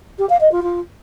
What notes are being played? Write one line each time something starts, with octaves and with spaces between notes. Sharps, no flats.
G4
F5
D#5
F4
F4